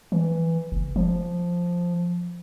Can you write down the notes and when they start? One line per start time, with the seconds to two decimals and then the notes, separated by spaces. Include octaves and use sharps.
0.12 E3
0.72 F#1
0.96 F3